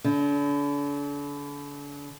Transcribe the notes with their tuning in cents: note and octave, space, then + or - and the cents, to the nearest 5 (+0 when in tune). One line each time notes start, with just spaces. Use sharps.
D3 -40